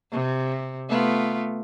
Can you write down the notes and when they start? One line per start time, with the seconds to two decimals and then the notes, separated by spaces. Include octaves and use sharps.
0.12 C3
0.89 A3 B3 F4